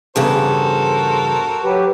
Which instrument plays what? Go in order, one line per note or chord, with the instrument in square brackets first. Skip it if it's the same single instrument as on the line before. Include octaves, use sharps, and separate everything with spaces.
[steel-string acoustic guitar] E2 G2 C#3 [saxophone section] F#4 A#4 C5 [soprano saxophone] A4
[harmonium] F#3 G4 B4